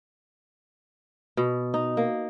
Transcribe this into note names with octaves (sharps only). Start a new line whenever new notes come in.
B2
D#4
A#3